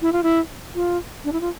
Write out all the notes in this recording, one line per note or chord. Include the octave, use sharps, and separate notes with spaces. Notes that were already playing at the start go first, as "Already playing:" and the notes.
E4
F4
E4
F4
D4
E4
F4